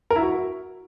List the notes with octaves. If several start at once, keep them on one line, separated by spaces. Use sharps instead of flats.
A#4
E4
F#4